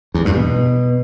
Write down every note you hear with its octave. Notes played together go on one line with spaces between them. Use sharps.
E2
G2
B2